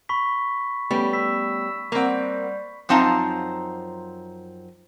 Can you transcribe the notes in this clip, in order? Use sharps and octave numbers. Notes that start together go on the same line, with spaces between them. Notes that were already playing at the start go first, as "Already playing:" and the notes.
B5 C#6 B6
G3 A3 B3 C#4
E6 B6
G3 A#3 C4 A#4 F#5
F#2 F3 C4 D#4 F5 A5